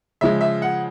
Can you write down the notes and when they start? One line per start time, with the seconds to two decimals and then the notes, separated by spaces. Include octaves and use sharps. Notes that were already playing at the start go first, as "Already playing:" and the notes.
0.21 C#3 F3 G#3 E5
0.41 E5
0.62 F#5